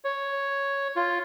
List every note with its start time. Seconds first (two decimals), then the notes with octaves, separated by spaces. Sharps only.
0.05 C#5
0.96 F4